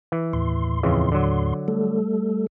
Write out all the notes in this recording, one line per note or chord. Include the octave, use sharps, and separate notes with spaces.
E3
D#2 A2 C6
F2 C#3 E3
D3 F#3
G3 A3 A4